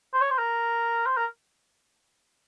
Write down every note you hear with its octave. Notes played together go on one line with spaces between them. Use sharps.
C5
C#5
C5
A#4
C5
A#4